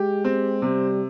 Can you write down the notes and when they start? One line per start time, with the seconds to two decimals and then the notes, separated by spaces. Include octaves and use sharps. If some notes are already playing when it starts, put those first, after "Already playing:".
Already playing: G#3 G4
0.24 C4
0.62 C3 G3